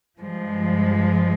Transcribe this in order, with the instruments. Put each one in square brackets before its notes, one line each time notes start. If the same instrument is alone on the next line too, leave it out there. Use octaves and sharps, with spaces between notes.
[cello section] G2 F3 G#3